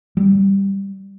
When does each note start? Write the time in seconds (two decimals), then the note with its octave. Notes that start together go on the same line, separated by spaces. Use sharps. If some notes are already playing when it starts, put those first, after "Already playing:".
0.17 G3